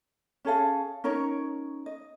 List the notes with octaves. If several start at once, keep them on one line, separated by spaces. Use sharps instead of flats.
C#4 G#4 A4 F5
C#4 D#4 A#4 C#5
D#5